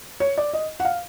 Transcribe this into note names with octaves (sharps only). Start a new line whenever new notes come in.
C#5
D5
D#5
F#5
F5